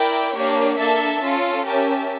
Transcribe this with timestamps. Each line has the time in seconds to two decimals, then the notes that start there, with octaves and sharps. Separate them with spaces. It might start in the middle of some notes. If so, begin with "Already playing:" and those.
Already playing: E4 A#4 D5 G5
0.34 A#3 D4 G4 C#5
0.78 A#3 D4 A4 E5 A5
1.22 C#4 F4 A4
1.65 C#4 G4 A#4 E5 A5